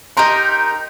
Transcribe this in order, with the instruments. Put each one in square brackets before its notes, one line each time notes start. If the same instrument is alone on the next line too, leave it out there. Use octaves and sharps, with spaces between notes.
[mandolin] D#4 G4 A#4 [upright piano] A#5 C6